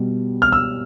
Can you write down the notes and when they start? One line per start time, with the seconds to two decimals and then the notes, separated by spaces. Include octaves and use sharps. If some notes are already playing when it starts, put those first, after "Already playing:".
Already playing: B2 G3
0.42 F6
0.52 E6